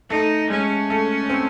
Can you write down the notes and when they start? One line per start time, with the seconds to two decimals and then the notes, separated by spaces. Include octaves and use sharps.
0.10 A3 D#4
0.50 G#3 C#4
0.90 A3
1.30 C4